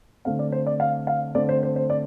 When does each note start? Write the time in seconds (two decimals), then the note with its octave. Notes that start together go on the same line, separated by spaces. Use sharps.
0.25 D3 A3 C4 F5
0.39 D5
0.52 C5
0.66 D5
0.80 F5
1.07 F5
1.34 D3 A3 C4 D5
1.49 C5
1.63 C5
1.76 C5
1.90 D5